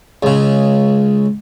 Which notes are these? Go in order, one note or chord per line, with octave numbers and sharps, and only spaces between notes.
C#2 C#3